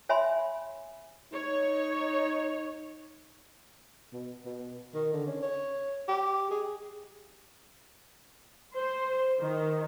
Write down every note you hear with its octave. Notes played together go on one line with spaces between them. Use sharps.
C#5 E5 G#5 B5 C6
D#4 C#5
B2
B2
D#3
D3
C#4
C#5
G4
G#4
C5
D#3